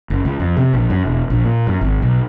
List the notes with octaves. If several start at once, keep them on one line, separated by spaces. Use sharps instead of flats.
F#1
C#2
F2
C3
A#1
F#2
E1
A#1
A#2
F#2
G#1
B1